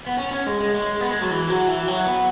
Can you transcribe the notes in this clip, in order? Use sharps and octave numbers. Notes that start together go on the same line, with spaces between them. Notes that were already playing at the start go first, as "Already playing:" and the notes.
B3
C#4
C#4
G#3
G#3
G#3
B3
G#3
F#3
E3
F#3
E3
F#3
B3